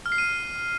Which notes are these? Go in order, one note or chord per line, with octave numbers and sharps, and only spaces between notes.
F6
C7
D#7